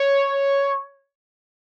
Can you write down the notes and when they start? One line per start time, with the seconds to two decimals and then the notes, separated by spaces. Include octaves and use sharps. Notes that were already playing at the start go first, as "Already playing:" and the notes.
Already playing: C#5